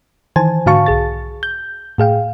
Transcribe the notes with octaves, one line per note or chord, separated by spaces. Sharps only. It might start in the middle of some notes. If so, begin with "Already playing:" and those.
D#3 E3 C5 G#5 A5
G#2 D3 F#4 F5 A5 C#6
B1 G#4 A6
G6
A2 G#4 F5 G5